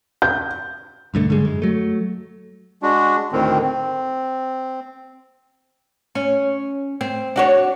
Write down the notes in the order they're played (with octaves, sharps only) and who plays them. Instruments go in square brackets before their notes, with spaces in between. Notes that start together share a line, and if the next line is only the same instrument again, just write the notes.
[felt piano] G6
[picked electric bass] B1 G2 D3 A3
G#2 D3 G3 G#3
F#2 G#3
F#3 A3
[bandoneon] G#3 D4 F#4
D2 A2 D#3 C4
C4
[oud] C#4
C4
D4 F#4 C#5